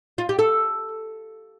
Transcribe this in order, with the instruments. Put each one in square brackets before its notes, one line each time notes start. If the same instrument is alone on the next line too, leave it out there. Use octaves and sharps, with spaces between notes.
[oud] F4
G4
A4